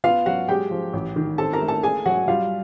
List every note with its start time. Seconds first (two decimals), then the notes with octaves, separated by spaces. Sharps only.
0.04 B3 F4 F5
0.26 F#3 F#4 F#5
0.49 G#3 G4 G5
0.71 F3
0.93 A1
1.16 D#3
1.38 C4 A4 A5
1.53 A#4 A#5
1.61 A3
1.68 A4 A5
1.83 A#3 G#4 G#5
2.06 F#3 F#4 F#5
2.28 G3 F4 F5